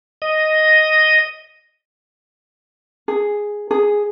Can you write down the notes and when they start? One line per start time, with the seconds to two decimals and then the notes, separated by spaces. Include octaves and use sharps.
0.22 D#5
3.08 G#4
3.71 G#4